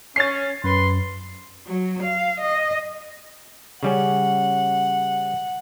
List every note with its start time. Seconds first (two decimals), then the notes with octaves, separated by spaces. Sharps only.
0.16 C#4 A6 C7
0.64 F#2 B4 C6
1.67 F#3
2.03 F5
2.41 D#5
3.83 C#3 G3 C#4 F#5